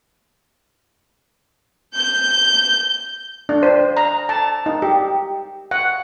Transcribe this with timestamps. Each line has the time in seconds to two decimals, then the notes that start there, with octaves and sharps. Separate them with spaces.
1.96 G6
3.49 D4
3.63 C5
3.97 A#5
4.29 A5
4.66 D#4
4.82 G4
5.71 F#5